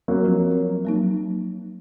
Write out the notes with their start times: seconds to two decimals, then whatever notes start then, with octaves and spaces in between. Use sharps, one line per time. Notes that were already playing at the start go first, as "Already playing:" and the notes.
0.08 F#3 A#3
0.24 F3 C4 F4
0.85 F#3 A#3 D#4